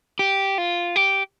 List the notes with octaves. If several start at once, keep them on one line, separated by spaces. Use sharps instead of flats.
G4
F4
G4